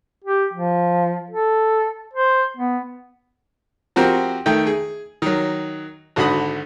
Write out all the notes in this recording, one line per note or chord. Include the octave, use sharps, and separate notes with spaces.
G4
F3
A4
C5
B3
F3 C4 F#4 G4 A#4
D#3 A3 G5
G#4
D#3 F#3
G#1 D3 F#4 B5 D#6